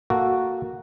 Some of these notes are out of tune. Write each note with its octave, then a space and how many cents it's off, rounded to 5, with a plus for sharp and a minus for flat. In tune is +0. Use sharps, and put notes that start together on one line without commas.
A#3 +0 F#4 +0 A4 +0